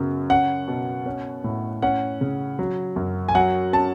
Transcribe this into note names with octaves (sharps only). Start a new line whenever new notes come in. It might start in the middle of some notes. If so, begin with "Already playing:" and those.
Already playing: F#2 C#3 B3
C#4 F#5
B2
C#4
A2
C#4 F#5
C#3
F#3
F#2
G#5
F#3 F#5
C#4 A5